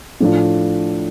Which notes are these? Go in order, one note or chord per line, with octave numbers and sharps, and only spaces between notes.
A2 F3 A3 D4 F4